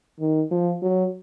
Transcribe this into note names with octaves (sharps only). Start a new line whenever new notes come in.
D#3
F3
F#3